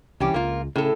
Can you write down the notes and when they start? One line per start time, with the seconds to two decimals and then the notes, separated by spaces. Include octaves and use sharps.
0.20 C2 E3 G3 C#4 G4
0.34 C#2 A#3 F4
0.76 A2 C#3 A4